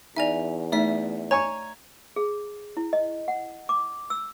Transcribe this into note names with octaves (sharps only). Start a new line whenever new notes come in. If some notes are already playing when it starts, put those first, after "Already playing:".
E2 D#4 D5 E5 G#5 F7
A3 D#4 D5 E5 B6
C#5 G#5 A#5 C#6
G#4
E4
D#5
F#5
D6
E6